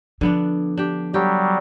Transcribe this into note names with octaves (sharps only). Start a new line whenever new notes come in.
D3 F3 B3 D4
D4 G4
F#3 G3 G4